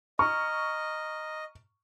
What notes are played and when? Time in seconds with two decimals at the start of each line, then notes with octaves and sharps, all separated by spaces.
0.19 D#5 A#5 C#6 F6